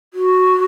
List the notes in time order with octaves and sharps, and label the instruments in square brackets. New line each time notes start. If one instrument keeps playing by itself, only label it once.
[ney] F#4